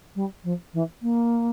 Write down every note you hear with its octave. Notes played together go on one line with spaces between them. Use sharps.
G3
F3
E3
A#3